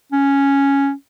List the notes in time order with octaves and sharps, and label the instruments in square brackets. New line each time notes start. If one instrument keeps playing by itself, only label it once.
[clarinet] C#4